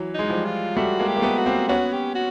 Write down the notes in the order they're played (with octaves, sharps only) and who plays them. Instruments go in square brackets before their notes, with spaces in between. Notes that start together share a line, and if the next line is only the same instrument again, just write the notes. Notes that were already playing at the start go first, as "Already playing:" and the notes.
Already playing: [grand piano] E3 F#3
[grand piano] G#3 [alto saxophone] D#4
[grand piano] F3 G3
[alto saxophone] F4
[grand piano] G3 A3 [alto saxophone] F#4
[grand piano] G#3 A#3
[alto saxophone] G4
[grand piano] A#3
A3 B3
[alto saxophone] F#4
[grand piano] A#3 C4
[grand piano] B3 C#4 [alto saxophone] F#4
[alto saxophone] G4
F#4